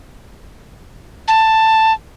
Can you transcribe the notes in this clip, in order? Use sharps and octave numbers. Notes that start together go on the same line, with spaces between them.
A5